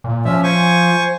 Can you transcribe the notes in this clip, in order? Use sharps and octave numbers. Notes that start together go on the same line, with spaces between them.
A#2
F3 C#4 E5
C5 G#5 C#6